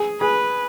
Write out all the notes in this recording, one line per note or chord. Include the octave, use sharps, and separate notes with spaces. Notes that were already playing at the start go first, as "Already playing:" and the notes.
Already playing: G#4
G#4 B4